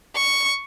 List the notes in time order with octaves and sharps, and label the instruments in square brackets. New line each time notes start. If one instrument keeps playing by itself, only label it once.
[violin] C#6